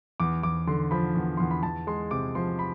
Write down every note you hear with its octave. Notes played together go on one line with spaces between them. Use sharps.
E2 D6
E2 D6
D3 C6
F3 B5
E2
E2 C6
B5
E2 A5
G#3 C6
C3 D6
F3 C6
B5